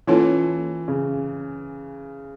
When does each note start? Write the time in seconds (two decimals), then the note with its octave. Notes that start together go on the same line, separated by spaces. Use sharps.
0.07 E3 A#3 C#4 F4 A4 C#5
0.88 C#3